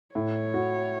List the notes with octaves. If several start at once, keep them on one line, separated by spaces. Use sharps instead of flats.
A2 C#5
F#4